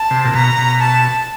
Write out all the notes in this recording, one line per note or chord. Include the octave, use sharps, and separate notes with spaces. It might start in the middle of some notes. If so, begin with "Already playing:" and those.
Already playing: A5
C3
A#2
B2 A#5
B2
A5